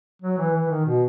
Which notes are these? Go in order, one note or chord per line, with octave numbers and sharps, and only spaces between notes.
F#3
E3
E3
D#3
B2